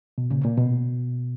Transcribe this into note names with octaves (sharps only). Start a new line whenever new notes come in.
B2
A#2 C#3
A#2
B2